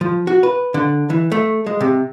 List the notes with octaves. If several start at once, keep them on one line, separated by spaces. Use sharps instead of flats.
F3
F#4
B4
D3
E3
A3
G#3
C3